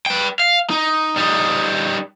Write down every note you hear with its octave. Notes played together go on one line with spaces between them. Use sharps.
B4 G5
F5
D#4
G3 D#4